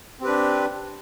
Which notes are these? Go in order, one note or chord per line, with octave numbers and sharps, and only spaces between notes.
C4 D4 G4 B4